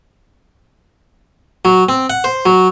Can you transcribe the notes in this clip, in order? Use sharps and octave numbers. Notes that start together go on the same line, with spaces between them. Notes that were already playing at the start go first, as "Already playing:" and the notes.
F#3
C4
F#5
C5
F#3